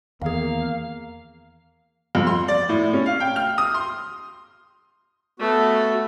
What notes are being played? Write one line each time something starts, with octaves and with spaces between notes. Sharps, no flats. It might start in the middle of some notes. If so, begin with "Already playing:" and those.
E2 D#3 A#3 G#4 F5
F2
C6
D5
A2
C#4
F5
G5
F6
D#6
C6
A3 B3 F#4